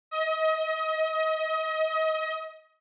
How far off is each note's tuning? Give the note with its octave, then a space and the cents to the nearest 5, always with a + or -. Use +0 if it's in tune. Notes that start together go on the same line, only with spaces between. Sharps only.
D#5 +30